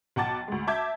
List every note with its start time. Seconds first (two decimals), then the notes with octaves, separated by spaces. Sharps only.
0.16 B1 F#5 G5 A5 D6 A6
0.48 D2 G#3
0.67 E5 A5 D6 G6 G#6